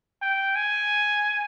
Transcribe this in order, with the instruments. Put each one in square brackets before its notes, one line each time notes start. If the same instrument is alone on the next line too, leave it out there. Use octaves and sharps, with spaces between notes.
[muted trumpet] G5
G#5